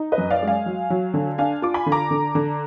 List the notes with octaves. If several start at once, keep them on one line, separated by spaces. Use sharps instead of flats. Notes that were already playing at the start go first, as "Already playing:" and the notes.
Already playing: D#4
B4 D#5
F#2
D5 F5
G#3
F5 G#5
F#3
F#3
D3
D4 F5 G#5
F4 D6
G#5 B5
D3
A#5 D6
D3
D3